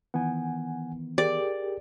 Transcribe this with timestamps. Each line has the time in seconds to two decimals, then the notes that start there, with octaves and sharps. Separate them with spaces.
0.14 D#3 E3 B3 F#5 G#5
1.18 G4 G#4 A#4 D5